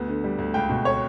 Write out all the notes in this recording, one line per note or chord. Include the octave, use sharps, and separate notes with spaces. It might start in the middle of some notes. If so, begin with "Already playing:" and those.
Already playing: D2 B3
D3
G3
D2
C#2 G5
B2
A3 C#5